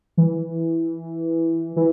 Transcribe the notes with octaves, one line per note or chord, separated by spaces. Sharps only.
E3
E3